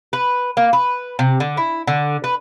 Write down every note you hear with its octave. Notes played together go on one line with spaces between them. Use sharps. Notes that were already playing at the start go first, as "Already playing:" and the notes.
B4
A#3
B4
C3
D3
E4
D3
B4